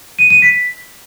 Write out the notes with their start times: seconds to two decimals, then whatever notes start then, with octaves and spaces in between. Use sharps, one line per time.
0.19 D#7
0.30 D#7
0.42 B6